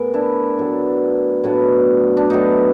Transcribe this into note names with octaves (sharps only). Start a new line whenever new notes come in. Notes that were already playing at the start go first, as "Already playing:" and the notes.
Already playing: A2 B3 G#4 A#4
D4 E4
A2 F#3 B3 D4
A2 F#3 B3 D4
D4
A2 F#3 B3 D4 D#4